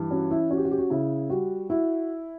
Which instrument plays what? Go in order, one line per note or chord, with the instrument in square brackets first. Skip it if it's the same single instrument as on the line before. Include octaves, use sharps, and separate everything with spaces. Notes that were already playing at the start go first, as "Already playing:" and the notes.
Already playing: [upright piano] G2 E3
[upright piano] C#4 [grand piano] F#4
[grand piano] E4
[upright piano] C#4 [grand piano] F#4
[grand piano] G4
F#4
G4
F#4
[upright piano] C#3 [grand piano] E4
[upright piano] G3 [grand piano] F#4
[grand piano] E4 [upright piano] F#4